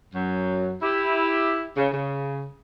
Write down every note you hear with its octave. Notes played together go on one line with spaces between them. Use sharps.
F#2 F#3
E4 G4
C#3
C#3